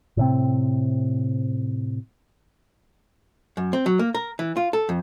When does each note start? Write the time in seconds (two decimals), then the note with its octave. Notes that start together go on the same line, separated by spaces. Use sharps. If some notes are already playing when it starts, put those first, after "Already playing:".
0.17 A2 C3 C4
3.57 F#2
3.73 C4
3.86 F#3
3.99 A#3
4.15 A#4
4.39 E3
4.57 F4
4.73 A4
4.89 F2